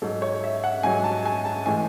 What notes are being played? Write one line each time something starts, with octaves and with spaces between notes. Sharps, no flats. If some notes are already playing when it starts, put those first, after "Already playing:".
G#2 F#3 A4
C#5
E5
F#5
G#2 F#3 G#5
A5
G#5
A5
A2 E3 G#3 G#5